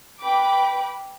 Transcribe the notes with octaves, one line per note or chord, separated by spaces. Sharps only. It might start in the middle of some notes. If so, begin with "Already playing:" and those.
B4 G5 B5 D6